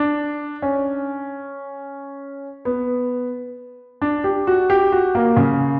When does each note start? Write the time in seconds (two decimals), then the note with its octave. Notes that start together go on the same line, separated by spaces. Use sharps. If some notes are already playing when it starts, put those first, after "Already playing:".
Already playing: D4
0.62 C#4
2.65 B3
4.02 D4
4.24 G4
4.47 F#4
4.70 G4
4.92 F#4
5.15 A#3
5.37 C#3